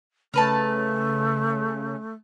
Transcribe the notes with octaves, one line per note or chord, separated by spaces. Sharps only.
C#3 A3 A#4 B4 A5